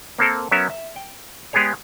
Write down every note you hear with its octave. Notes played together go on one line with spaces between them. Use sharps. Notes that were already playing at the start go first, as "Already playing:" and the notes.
A#3 C4 A4 A#4
F#3 B3 C#4 A#4 E5
E5
G5
G#3 B3 G4 G#4 C#5